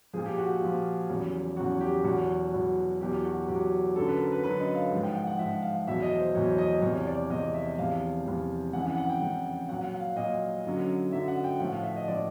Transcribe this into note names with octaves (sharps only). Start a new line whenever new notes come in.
A#2 F3 G#4
G4
F#4
G4
A#2 F3
E2 C#3 F#3
E2 C#3 F#3 F#4
G4
E2 B2 F#3 F#4
E2 B2 F#3
E2 B2 F#3 G4
F#4
E2 B2 F#3 G4
F#2 D3 F#3 A4
B4
A#4
B4
F#2 D3 F#3 B4
D#5
F5
G#2 F3
G5
F#5
F#5
G#2 F3 E5
F5
E2 B2 F#3 E5
D#5
C5
E2 B2 F#3 C#5
D#5
E2 C3 F3 C#5
D5
E2 C3 F3 D#5
E5
E2 C3 F3 F5
E2 C3 F3
F2 C#3 E3 F#5
F#5
F#5
G5
F2 C#3 E3
A#2 F#3 F#5
F#5
F5
A#2 F#3 D#5
F#2 D3 F#3
F#2 D3 F#3 E5
F#5
G5
A2 F3 F#5
F5
E5
D#5
A2 F3 D5